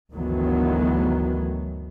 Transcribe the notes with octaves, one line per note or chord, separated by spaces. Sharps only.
G1 D2 D#3 E3 F#3 B3